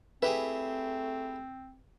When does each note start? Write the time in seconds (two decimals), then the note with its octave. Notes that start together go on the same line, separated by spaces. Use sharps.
0.22 A3 C4 E4 G4 G#4 B4